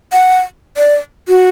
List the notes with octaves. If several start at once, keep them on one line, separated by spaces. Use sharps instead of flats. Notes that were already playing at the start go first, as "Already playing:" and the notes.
F#5
D5
F#4